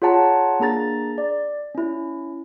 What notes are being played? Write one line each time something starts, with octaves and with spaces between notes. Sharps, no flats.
F4 G#4 C#5 F#5 A5 A#5
A#3 D4 G#4 A#5 A6
D5
C#4 E4